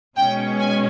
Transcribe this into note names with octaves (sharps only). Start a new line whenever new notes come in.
B2 G#3 C#4 G5
G#5